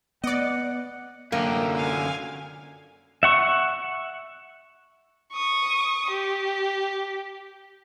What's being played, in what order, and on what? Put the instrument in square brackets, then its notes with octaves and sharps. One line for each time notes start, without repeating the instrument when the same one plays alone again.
[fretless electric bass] B3 [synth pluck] D5 D#5 [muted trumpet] F#5
[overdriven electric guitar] F#2 D3 [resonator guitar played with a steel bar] A#3 [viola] G5
[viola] F5 G#5
[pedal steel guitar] E5 F#5 C#6
[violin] C#6 D#6
G4